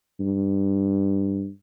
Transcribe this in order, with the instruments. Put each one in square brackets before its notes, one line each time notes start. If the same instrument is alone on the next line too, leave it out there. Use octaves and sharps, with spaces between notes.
[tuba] G2